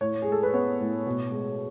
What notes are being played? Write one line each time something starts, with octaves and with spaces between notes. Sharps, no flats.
A2 C#5
G#3 G#4
A4
B4
B3 C#5
A2
B2
G#3